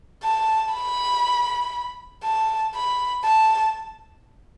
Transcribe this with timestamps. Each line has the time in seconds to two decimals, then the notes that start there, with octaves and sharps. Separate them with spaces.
0.24 A5
0.74 B5
2.24 A5
2.75 B5
3.25 A5